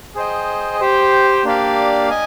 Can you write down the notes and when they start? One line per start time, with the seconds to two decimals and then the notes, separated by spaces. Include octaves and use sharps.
0.15 G#4 C5 D#5 G5
0.80 G4 C5 G5
1.44 A#3 D4 G4 D5 F5
2.10 D#5 G#5